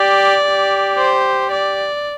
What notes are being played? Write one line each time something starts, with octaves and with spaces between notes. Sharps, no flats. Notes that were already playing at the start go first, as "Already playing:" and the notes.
Already playing: G4 D5
G4
C5
D5